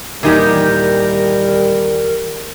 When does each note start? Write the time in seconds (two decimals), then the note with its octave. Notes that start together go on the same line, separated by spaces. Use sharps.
0.23 D#2 A#2 E3 G3 D#4 G4 A#4